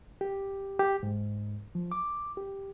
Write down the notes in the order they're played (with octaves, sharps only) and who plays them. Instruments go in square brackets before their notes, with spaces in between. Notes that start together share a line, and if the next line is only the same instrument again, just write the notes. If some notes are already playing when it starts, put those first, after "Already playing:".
[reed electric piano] G4
G4
G#2
F3
D6
G4